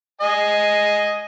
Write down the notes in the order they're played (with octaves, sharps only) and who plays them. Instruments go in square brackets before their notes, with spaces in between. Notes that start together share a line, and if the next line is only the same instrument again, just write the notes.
[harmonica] D#5 G#5